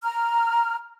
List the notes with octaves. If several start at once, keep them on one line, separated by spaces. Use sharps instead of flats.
A#5 F6